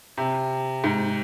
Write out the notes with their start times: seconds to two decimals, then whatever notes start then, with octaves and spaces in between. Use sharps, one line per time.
0.18 C3
0.84 G#2